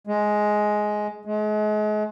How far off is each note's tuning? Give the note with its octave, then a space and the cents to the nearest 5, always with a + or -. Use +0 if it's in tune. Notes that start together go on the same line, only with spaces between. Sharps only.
G#3 +10
G#3 +35